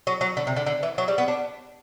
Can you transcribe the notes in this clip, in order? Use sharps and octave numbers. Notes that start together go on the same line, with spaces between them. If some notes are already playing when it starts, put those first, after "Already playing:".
F#3
F#3
D3
C3
D3
D3
E3
F#3
G3
B3
D4